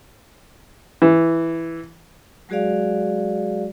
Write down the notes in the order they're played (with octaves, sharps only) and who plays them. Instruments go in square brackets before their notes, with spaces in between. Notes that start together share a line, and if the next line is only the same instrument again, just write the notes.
[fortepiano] E3
[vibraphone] F#3 G#3 F#4 G#4 D5 F5